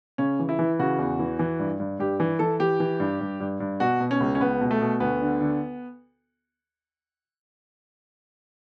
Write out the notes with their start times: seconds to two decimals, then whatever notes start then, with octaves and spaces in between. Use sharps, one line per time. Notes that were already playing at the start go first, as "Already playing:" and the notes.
0.18 C#3 C#4
0.39 E3
0.49 E4
0.59 E3
0.79 C#3 F#4
0.99 E2
1.19 E3
1.39 E3
1.59 G2
1.80 G2
1.99 G2 G4
2.20 E3
2.39 E3 A4
2.60 E3 G4
2.80 E3
3.00 G2
3.21 G2
3.40 G2
3.60 G2
3.80 B2 F#4
4.00 B2
4.11 C#4
4.20 C#2
4.35 C#4
4.40 C#2 B3
4.61 B2
4.71 A3
4.81 B2
5.00 D2 B3
5.21 D3
5.41 D3